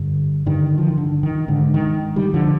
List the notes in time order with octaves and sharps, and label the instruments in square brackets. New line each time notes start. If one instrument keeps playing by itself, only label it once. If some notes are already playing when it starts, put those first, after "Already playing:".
Already playing: [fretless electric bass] G2 D3
G2 D3 D#3
F3
D#3
D3
D#3
G#2 D3
D#3
D#3 G3
D3 F3